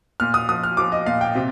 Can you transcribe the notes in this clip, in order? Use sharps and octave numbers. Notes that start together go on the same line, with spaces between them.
A#2 F6
D#6
F3 D#6
F6
F3 D6
D#5
A#2 F5
G5
C3